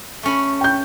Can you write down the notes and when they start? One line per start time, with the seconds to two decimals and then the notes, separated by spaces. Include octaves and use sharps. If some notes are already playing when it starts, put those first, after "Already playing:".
0.23 A3 C#4 B5
0.61 G5 G6